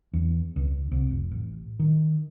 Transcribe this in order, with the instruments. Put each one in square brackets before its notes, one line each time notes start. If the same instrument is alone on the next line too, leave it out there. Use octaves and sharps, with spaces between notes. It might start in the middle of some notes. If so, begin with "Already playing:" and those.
[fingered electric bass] E2
C#2
C2
F1
A1
D#3